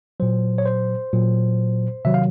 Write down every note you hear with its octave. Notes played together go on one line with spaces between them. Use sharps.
A#2 F#3 C5
C#5
C5
A#2 F#3
C3 D#3 F#3 E5
F5